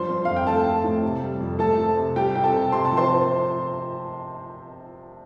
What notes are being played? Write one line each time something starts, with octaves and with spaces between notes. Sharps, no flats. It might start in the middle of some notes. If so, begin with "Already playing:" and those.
Already playing: G2 F3 C5 C6
C4
F2 F5
G5
A3 A4 A5
C4
A2
C3
G3
F2
A3 A4 A5
C4
C3
G3 G4 G5
C4 G5
A4 A5
C3
C3 C6
A5
F3
C5 C6
C4